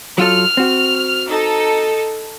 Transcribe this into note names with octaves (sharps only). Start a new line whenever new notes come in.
F#3 F4 A4 F6
C4 F#4
D#4 A4